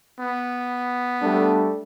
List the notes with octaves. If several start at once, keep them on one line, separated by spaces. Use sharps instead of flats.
B3
G3 A3 D4